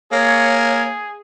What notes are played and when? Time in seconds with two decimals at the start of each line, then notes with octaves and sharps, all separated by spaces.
0.12 A#3 G#4 C#5